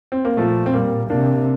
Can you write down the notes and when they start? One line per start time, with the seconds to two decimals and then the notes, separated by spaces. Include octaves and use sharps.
0.12 C4
0.25 A#3
0.37 A#2 F3 A3
0.66 C4
0.74 G3 A#3
1.10 C3 A#3 D4